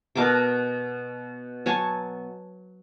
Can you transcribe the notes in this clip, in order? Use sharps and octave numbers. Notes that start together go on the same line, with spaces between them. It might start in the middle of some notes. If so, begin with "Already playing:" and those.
B2 A#4 A5 D6
F#3 C#5 G#5 A5